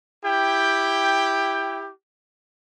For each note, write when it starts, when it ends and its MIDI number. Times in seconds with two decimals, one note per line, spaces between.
0.24 1.90 64
0.24 1.90 67
0.24 1.90 79